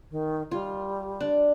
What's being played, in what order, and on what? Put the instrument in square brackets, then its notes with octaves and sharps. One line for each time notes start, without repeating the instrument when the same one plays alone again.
[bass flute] D#3
[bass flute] G3 [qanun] F4
[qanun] D4